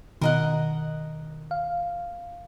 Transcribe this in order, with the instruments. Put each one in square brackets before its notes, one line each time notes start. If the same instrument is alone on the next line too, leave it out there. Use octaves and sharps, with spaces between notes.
[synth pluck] B2 D#3 [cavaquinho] A#4 D#5 F#5
[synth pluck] F5